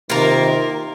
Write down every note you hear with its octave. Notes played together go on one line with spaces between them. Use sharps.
C3 D#3 A#3 F4 A#4